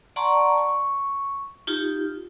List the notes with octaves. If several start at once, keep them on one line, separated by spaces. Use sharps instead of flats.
D5 F#5 A5 A#5 C6 C#6
C#6
D#4 F4 G4